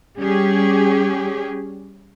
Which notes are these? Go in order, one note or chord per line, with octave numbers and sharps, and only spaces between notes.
G3 C#4 G4 G#4